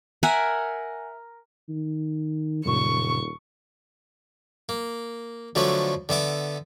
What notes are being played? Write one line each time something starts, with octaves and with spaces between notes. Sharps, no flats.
A#4 E5 F#5 G#5
D#3
D#1 F#2 A#2 C#3 C#6
A#3
D3 F3 F#3 A3 D4 B4
D3 B3 E5 D6